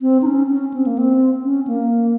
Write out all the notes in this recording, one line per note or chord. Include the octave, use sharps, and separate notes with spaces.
C4
D#4
C#4
C#4
C4
A#3
C4
C#4
A#3